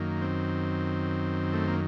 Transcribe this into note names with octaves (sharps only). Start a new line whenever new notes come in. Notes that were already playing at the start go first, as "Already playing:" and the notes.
Already playing: F#2 D#3 A#3
C4
A3
A#3